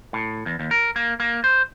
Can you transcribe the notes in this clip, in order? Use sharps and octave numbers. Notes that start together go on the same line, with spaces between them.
A2
E2
D#2
A#4
A#3
A#3
C5